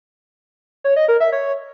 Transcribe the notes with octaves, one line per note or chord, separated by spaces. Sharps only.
C#5
D#5
A#4
E5
C#5